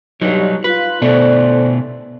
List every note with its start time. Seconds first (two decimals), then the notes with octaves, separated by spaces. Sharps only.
0.21 G2 F#3 D#4
0.64 F4 B4
1.02 B2 A3 B3 A4 C5 D5